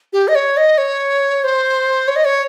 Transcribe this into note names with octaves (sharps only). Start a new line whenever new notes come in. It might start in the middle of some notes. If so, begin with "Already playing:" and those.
G4
D#5
C#5
D#5
C#5
C5
C#5
D#5
C#5